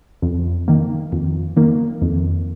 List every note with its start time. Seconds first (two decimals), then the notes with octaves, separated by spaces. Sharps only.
0.22 F2
0.68 D#3 A#3
1.12 F2
1.57 D#3 A#3
2.02 F2